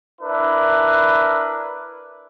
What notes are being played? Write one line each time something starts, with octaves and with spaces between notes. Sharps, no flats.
D4 E4 A#4 B4